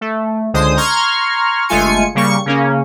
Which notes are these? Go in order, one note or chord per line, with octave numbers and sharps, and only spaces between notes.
A3
C#2 D3 G#3 C5 D#6
A#5 C6 C#6 F6 G#6
G1 G#3 A3 F4 G#5 C#7
C#3 G3 A#3 C#6 C#7
C#3 A#3 C#4